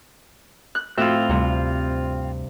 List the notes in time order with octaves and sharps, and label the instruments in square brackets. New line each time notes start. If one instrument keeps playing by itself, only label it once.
[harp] F#6
[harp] A2 E5 F#6 [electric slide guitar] C4 F4 [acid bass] F#4
[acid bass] D2 [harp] G2 C3